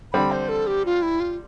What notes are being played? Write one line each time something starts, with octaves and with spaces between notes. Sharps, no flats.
D3 G3 C4 B5
C5
A4
G4
F4
E4
F4